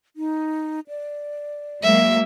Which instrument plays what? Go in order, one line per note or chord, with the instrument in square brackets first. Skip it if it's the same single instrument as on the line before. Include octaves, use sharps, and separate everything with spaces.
[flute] D#4
D5
[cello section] F#3 G#3 A#3 [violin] E5